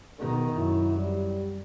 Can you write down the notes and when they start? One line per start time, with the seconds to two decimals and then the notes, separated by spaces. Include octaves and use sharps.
0.19 B2 D#3
0.56 F#2 E4
0.97 G3